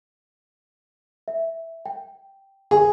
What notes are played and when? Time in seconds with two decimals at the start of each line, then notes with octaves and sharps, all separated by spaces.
1.28 E5
1.86 G5
2.71 G#4